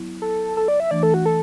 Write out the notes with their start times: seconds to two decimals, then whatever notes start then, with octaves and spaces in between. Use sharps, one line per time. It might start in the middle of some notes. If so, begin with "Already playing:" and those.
Already playing: F#3 B3 E4
0.22 A4
0.57 A4
0.68 D5
0.80 E5
0.91 E3 A3 D4 D5
1.03 A4
1.14 F#4
1.26 A4